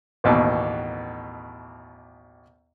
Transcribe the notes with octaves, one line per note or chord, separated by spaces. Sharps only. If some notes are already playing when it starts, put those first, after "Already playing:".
A1 D#2 B2